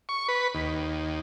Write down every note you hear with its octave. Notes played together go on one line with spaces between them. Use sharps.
C#6
B4
D#2